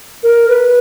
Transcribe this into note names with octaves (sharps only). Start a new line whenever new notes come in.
A#4
B4